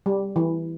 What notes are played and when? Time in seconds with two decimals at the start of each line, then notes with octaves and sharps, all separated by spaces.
0.06 G3
0.36 E3